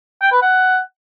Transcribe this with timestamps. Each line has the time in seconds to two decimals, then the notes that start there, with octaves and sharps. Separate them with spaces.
0.21 G5
0.32 B4
0.42 F#5